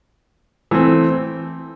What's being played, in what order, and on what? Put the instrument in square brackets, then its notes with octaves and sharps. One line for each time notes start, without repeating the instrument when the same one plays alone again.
[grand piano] E3 A3 C4